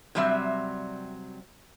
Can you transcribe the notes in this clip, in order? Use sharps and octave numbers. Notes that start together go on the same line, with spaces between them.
C3 F#3 G3 C4 E5